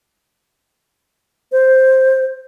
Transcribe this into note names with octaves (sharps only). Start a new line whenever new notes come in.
C5